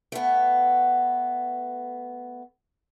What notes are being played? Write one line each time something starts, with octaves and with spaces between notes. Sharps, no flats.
A3 B3